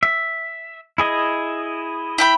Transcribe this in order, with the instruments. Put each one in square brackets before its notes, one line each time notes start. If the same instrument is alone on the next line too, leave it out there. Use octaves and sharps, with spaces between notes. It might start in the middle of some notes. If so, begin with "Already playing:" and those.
[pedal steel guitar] E5
E4 G#4 D#5
[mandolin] E4 G5 B5